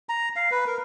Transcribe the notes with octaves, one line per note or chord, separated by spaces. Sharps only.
A#5
F5
B4
A#4